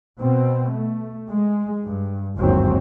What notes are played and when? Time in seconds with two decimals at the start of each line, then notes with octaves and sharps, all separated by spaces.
0.19 B2 C4
0.70 A3
1.29 G#3
1.85 G2
2.36 G1 D#2 G#2 D#3 F#3 C4